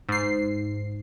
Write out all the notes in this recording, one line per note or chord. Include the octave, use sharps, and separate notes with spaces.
G#2 C7